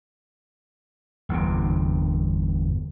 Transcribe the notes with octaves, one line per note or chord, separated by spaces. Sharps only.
G1 E2 G2 C3